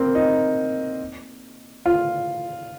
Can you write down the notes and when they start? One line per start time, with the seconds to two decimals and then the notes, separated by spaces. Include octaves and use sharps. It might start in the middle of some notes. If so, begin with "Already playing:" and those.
Already playing: A#3 C4
0.15 D#4
1.86 F4